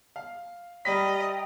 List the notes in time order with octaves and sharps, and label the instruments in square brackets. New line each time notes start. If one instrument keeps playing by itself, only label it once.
[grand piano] F5
[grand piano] G3 B5 B6 [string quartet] D#5 [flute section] E5 G5 A#5